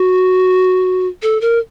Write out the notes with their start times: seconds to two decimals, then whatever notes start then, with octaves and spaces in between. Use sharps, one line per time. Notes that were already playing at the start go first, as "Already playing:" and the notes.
Already playing: F#4
1.23 A4
1.41 A#4